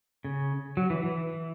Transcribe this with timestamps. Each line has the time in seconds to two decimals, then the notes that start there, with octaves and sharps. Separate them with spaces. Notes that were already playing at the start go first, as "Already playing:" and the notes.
0.24 C#3
0.77 F#3
0.90 E3
1.03 E3